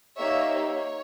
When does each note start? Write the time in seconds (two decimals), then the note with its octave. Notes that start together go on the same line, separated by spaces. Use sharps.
0.18 A#3 D#4 G4 C#5 E5
0.53 C#5